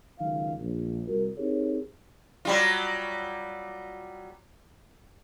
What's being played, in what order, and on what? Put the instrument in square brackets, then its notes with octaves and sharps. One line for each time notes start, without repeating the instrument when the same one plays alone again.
[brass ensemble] C#2 D#3 F#3 F5
A#1
C2 G3 F#4 A#4
C4 D#4 G4 G#4 A#4 C#5
[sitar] F#3 G3 F4